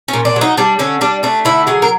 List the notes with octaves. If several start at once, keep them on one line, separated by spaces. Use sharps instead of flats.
C#4
A#2
D4
F#3
D#4
G3 D4
D3 C#4
G3 D4
A3 D4
D3 E4
F#3 G#4
A#4